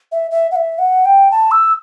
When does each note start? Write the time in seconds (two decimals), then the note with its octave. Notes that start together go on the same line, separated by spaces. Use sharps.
0.12 E5
0.31 E5
0.51 F#5
0.56 E5
0.79 F#5
1.05 G5
1.31 A5
1.51 E6